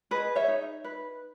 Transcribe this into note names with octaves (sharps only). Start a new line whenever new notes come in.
G#4 B4 D#5
C#5 E5
D#4
B4